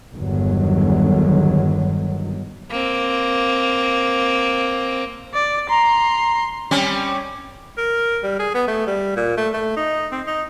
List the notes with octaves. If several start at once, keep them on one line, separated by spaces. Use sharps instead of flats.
G1 E2 D3 D#3 F#3
A#3 C4
D5
A#5 C6
G3 C4 C#4
A#4
G3
G#4
B3
A3
G3
A#2
A3
A3
D#4
C4
D#4